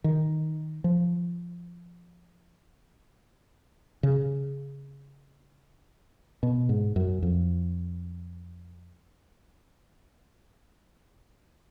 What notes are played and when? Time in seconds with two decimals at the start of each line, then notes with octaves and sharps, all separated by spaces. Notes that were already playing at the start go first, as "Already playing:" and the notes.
0.04 D#3
0.84 F3
4.03 C#3
6.43 B2
6.69 G#2
6.96 F#2
7.23 F2